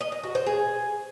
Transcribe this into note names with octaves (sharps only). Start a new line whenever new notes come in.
D#5
D#5
F#4
C5
G#4